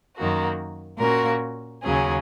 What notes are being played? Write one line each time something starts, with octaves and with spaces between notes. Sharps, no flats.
F#2 D#3 A#3 F#4
A#2 A#3 C#4 F#4 A#4
D#2 C#3 F#3 C#4 G#4